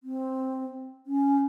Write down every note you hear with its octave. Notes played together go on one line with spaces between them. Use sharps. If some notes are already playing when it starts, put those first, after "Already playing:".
C4
C#4